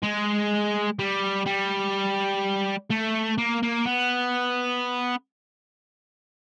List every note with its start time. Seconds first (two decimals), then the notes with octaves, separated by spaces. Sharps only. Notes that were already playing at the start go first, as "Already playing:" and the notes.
0.03 G#3
0.99 G3
1.46 G3
2.90 A3
3.38 A#3
3.63 A#3
3.86 B3